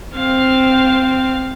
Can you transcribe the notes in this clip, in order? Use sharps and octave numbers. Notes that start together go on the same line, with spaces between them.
C4 F5